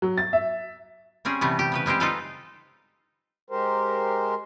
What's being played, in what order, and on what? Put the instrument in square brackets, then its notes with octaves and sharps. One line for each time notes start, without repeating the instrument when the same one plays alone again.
[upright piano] F#3
A6
E5
[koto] G3 C4 C#4 G#4
C3 E3 G3 A3 B3
G4
C#3 G4 B4
G3 G#3 C4 G4
D#4 F4 G4 A4 B4 F5
[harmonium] G#3 G4 A#4 C5